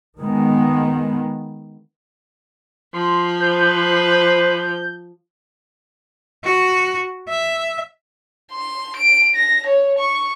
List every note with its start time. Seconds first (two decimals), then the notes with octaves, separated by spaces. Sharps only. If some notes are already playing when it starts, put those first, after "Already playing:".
0.19 D#3 G#3 B3
2.94 F3 C6
3.40 B4 C5 G6
6.44 F#4
7.28 E5
8.52 C6
8.97 D7
9.35 A#6
9.66 C#5
9.98 C#6